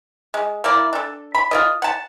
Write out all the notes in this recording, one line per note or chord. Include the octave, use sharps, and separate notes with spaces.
G#3
A#3 E4 D5
D4 A4
B5
F4 A4 D#5
F#5 A5